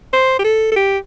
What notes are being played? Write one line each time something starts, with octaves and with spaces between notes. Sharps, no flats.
C5
G4
A4
A4
G4